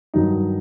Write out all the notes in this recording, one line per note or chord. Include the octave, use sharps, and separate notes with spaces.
G2 D#3 F#3 D#4